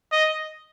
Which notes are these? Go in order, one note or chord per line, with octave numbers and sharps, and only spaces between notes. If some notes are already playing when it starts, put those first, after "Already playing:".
D#5